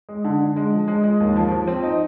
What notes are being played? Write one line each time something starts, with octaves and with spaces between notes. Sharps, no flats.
G#3
D3
D3
G#3
F3
G#3
G#3
D#2
F3
F3
C4
D#4